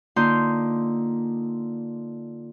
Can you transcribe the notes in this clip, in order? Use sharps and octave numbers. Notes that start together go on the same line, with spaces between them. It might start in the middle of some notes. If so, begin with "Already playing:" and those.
D3 A#3 D#4 F4 C6 G6